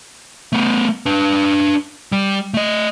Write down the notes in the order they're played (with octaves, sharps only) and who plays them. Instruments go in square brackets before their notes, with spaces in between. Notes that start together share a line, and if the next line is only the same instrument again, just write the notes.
[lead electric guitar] A3 B3
D4 B4
G3
A3 D#5